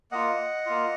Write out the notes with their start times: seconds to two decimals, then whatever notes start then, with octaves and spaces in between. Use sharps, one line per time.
0.11 A#3 F4 D#5 F#5
0.66 A#3 F4